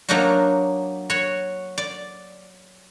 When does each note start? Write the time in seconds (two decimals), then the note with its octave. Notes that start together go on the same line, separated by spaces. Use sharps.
0.09 F#3 A#3 D4 D#4 F#4
1.10 F#4 C#5
1.78 D5